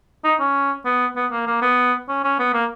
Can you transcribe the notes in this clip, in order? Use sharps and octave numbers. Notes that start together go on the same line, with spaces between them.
D#4
C#4
B3
B3
A#3
A#3
B3
C#4
C#4
B3
A#3